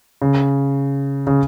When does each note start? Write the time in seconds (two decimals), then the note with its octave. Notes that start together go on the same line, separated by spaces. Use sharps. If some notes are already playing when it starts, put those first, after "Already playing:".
0.22 C#3
1.27 C#3